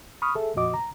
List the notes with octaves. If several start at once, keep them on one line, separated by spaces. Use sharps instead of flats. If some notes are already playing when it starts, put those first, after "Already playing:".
B5 C#6 D#6 F6
G#4 A4 E5
F2 A#2 F3 F#4 D#5 D6
A#5